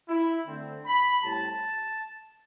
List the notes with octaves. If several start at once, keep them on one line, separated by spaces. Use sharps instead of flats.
E4
D3 A3 C4
B5
A2 G3 C4 A5